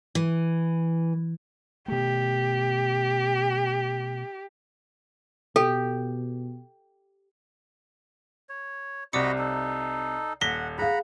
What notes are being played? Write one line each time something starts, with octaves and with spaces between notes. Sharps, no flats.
E3
B2 A3 G4
B2 G4 A4
C#5
C2 C3 F#4 D5 D#5 B5 D6 C#7
D#4 A4
D#1 F#5 A#6 B6 G7
G#4 F5 F#5 A#5 B5